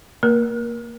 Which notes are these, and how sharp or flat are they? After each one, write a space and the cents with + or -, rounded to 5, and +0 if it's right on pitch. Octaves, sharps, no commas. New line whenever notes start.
A#3 -10 A#4 +30